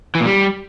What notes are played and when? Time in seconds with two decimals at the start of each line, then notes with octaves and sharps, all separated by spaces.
0.15 E3
0.20 A#2
0.26 G3